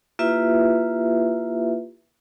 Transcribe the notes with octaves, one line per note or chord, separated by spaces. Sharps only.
A#3 E4 F4 G4 B4 E5